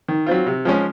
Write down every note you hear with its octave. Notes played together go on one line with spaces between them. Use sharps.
D#3
F#3 C4 F4
C3
F3 G#3 C#4